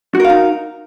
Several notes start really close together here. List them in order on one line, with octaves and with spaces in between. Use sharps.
F#4 A#4 F5 D#4